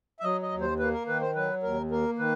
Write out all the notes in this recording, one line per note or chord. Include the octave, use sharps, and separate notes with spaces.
E5
F#3 D#5
D#5
D#2
C5
A#3 B4
A#4
D#3 B4
C5
F#3 B4
D#2 A#4
A#3 A#4
D#3 B4